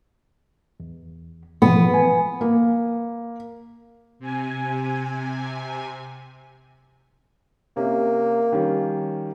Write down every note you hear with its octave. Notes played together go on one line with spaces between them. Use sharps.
E2
B2 E3 F3 B3
G#5
A#3
C3 G#5
C3 A#3 C#4
D#3 G3 C#4